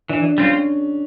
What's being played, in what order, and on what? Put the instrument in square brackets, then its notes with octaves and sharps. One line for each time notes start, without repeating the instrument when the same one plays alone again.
[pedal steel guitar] E3 [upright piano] D4
[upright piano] D4
[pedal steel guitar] G3 C4 F4 [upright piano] C#4